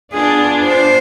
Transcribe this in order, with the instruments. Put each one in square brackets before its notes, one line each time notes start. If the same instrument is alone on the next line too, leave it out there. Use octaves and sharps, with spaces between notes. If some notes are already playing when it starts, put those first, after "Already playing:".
[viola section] B3 D4 F4 [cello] G#4
[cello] C5